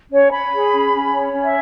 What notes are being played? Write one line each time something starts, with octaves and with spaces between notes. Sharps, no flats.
C#4 C#5
C#5 B5
G#4
C#4
C#4
C#5
C#4
E5